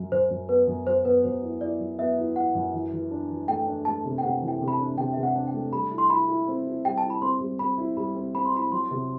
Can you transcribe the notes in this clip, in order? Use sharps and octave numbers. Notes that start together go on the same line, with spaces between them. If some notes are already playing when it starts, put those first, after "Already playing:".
Already playing: F#2 F#3
F#2 C5
F#2
B3 B4
F#2
F#3 C5
B3 B4
F#2 C5
E4
E4 D5
F#3
B3 E5
E4
E4 F#5
F#2
E3
E3
D4
E3
A3 G5
D4
A3 A5
C3
G5
C3 F#5
E3
G5
C3
B5
A5
D4
C3 G5
C3 E5
F#5
D4
G5
A3
G3 B5
E4
C6
E4 B5
E4
C4
E4
G3 G5
A5
E4
B5
C4 C6
G3
C4 B5
E4
G3 B5
C4
C4 B5
C6
E4 B5
F#3 C6
C3